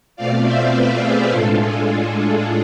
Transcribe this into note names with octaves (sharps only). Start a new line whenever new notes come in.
B2 A3 C4 F4 D5 F5
C5 E5
B4 D5
G#4 B4
A2 G#3 D4 F4 A4
G#4